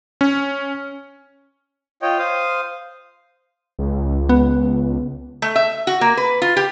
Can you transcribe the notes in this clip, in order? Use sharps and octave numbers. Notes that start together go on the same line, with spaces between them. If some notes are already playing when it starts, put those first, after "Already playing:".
C#4
F4 C#5 D#5 G5
C5 F5 D#6
C#2
B3
A3
E5
F#4
A#3
B4
F4
G4